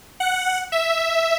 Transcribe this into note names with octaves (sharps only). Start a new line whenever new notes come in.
F#5
E5